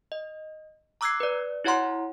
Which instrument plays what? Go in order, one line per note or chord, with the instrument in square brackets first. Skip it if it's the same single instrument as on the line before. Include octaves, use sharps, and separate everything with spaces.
[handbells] D#5
A#5 D6 E6 F#6 G#6 C7
B4 D5
E4 F#4 C#5 F#5 A#5 C6